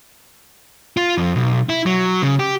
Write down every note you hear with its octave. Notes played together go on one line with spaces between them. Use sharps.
F4
F2
B1
E4
F#3
C#3
G4